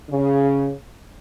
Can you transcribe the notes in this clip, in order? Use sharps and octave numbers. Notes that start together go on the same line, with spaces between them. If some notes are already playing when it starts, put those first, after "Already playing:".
C#3